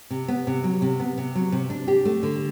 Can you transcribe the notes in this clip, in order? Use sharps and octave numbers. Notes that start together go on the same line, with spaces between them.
C3
B3
C3
F#3
C3
B3
C3
F#3
C3
D4
G4
A3
D3